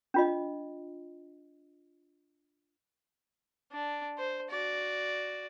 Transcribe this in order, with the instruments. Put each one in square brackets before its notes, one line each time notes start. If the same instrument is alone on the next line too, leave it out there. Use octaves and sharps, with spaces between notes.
[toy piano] D4 F4 D#5
[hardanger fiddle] D4
C5
F#4 D5